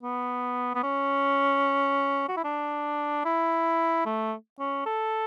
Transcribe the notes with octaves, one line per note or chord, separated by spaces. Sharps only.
B3
B3
C#4
F#4
E4
D4
E4
A3
C#4
A4